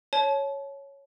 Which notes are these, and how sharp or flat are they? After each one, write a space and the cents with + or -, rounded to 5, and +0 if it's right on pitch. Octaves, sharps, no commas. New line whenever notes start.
C#5 +0 A5 -30